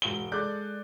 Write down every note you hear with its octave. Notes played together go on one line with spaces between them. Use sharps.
E1 G#2 D7 G7
G#3 A4 D5 D6 F#6 G6